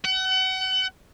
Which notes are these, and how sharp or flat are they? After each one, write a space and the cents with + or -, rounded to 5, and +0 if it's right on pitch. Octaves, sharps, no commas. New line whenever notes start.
F#5 +35